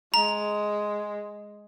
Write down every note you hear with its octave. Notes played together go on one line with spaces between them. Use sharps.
G#3 A#5